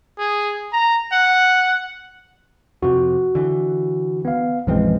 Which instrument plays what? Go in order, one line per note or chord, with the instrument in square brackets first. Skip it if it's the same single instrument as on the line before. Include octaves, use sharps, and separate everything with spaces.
[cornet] G#4
A#5
F#5
[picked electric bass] F2 C3 [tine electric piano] F#4
[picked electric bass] D3 E3
[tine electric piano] B3 F5
[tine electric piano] A#1 E3 G#3 [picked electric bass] F#2 F3 C4